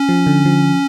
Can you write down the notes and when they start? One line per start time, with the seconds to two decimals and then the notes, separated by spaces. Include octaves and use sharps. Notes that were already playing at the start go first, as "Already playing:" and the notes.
Already playing: C#4
0.09 F3
0.27 D3
0.45 F3